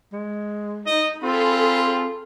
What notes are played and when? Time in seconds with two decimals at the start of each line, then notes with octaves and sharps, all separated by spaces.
0.13 G#3
0.86 D#4 D#5
1.23 C4 F4 G#4 A4 B5